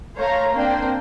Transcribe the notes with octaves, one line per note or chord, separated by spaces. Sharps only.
A3 C5 C#5 F5 A#5
A#3 C4 D4 C5 G5